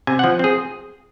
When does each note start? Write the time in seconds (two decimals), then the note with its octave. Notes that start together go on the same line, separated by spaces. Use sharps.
0.07 C3 G#5
0.19 F3 F#5
0.39 C4 G#4